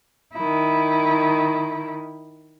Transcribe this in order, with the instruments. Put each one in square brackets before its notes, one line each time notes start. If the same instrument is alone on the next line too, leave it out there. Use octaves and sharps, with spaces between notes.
[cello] D#3 E4